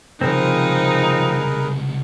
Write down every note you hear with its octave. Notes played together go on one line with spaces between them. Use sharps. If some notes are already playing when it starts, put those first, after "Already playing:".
C#2 C3 F3 C4 D#4 G#4 A#4 B4